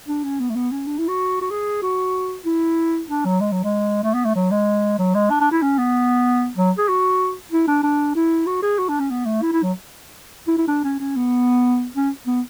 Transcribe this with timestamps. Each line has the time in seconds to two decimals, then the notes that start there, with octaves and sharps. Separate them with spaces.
0.09 D4
0.24 C#4
0.40 B3
0.50 A3
0.56 B3
0.72 C#4
0.87 D4
0.99 E4
1.09 F#4
1.42 F#4
1.51 G#4
1.82 F#4
2.46 E4
3.09 D4
3.25 F#3
3.41 G#3
3.52 F#3
3.64 G#3
4.04 A3
4.14 B3
4.26 A3
4.35 F#3
4.51 G#3
4.99 F#3
5.15 G#3
5.30 D4
5.41 D4
5.51 E4
5.63 C#4
5.78 B3
6.57 F#3
6.78 G#4
6.89 F#4
7.52 E4
7.68 D4
7.83 D4
8.15 E4
8.47 F#4
8.63 G#4
8.79 F#4
8.89 D4
9.00 C#4
9.11 B3
9.26 A3
9.42 E4
9.53 E4
9.63 F#3
10.48 E4
10.58 E4
10.68 D4
10.84 C#4
11.00 C#4
11.17 B3
11.96 C#4
12.27 B3